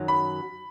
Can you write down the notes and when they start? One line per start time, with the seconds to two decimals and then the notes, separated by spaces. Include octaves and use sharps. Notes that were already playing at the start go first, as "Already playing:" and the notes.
Already playing: F#2 D#3 F#3
0.08 B5